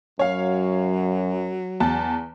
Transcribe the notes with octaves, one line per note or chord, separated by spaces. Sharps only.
F#2 F#3 C#5 F5
E2 A5